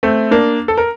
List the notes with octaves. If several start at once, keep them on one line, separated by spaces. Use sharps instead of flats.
A3 C4
A#3 D4
A4
A#4